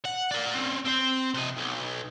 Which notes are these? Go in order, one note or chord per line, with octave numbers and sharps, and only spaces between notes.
F#5
A#4 D5
C4 C#4
C4 C5
C3 D#5
B1